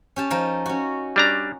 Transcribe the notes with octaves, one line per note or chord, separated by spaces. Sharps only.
C#4 G4 A5
F3 D#4 A#4
C#4 F#4
G3 D4 A#5